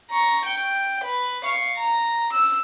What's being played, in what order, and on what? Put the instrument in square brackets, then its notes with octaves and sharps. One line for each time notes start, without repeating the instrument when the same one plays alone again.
[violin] A#5 C#6
G5
B4
F5 C#6
A#5
E6